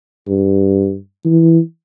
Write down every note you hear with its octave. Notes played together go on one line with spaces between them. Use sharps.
G2
E3